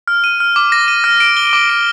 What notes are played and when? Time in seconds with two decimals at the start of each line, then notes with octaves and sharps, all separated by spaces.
0.08 F6
0.24 D#7
0.40 F6
0.56 D6
0.72 A#6
0.88 D#7
1.04 F6
1.20 D7
1.37 G7
1.53 D6
1.70 D7